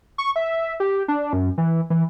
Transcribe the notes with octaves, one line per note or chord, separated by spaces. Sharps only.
C#6
E5
G4
D4
F#2
E3
E3